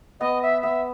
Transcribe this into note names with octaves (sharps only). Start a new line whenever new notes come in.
B3 D#5
E5
B3 E5